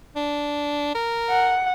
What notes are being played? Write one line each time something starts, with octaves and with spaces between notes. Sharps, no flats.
D4
A#4
F#5